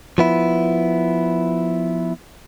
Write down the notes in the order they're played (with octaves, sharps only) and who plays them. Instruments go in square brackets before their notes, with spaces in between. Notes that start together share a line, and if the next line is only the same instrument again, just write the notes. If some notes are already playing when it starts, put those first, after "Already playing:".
[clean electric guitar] F3 B3 E4